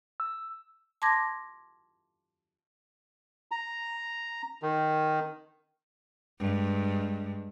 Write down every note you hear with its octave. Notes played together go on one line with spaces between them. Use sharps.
E6
A5 C6 D6 G#6 A#6
A#5
D#3
G2 G#3